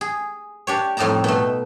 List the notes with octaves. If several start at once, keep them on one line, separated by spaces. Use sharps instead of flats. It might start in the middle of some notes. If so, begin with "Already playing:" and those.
G#4
D4 G4 C#5
F2 A2 G3 D#4 A5 A#5
B2 A3